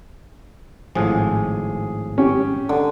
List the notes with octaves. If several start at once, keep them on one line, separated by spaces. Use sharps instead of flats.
G#1 A2 F3 G#4
C#4 G4
D3